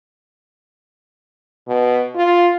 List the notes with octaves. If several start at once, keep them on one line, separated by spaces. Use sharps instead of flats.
B2
F4